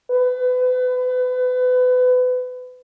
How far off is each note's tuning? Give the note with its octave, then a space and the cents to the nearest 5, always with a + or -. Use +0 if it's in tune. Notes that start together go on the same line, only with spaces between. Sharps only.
B4 +30